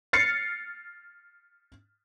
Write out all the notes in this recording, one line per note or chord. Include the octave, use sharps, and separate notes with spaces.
F6 A6 C7 C#7